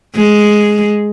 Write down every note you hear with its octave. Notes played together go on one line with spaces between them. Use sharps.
G#3